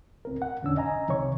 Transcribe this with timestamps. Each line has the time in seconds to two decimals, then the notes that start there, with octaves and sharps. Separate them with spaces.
0.25 C#2 C4 A#4
0.42 F#5
0.63 E2 D3 C#4 D4 E6
0.77 D#5 G#5 A#5
1.08 C2 C3 D#3 C#5 C#6